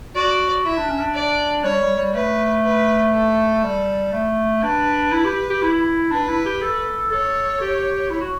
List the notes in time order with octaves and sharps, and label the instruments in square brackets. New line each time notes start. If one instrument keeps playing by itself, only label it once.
[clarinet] F#4 [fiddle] D5
[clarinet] E4 [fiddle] E5
[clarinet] D4
C#4
D4
[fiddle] D5
[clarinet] G3 [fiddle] C#5
[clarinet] G3
G3
[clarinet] A3 [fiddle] B4
[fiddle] B4
A4
[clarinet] G3
A3
[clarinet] D4 [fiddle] B4
[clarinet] E4
G4
G4
E4
[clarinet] D4 [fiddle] B4
[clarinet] E4
G4
A4
[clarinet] A4 [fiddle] C#5
[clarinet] G4
E4
F#4